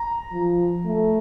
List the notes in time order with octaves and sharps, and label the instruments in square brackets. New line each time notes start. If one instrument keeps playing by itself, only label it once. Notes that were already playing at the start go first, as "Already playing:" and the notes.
Already playing: [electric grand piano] A#5
[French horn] F3
A3